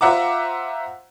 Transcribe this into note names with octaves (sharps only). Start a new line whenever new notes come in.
F4 C5 E5 F#5 A#5 D6